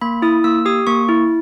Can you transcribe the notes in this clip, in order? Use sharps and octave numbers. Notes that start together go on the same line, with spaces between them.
A#3 B5
E4 D#6
A#3 E6
G4 D#6
A#3 C#6
E4